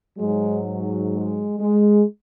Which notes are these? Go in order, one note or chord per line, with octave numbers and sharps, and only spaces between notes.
G#2 F#3 G#3
G#3
G#3